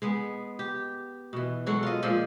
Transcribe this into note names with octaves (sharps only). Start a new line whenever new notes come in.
G#3 B3 G#4
G4
B2 E3
F#3 G#3 F#4 A4
F4 D#5
A#2 F3 G#3 D#5